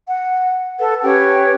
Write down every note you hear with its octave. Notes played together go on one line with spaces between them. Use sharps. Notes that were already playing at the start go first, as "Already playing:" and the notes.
F#5
A4 B4 F#5
C#4 G4 B4 G5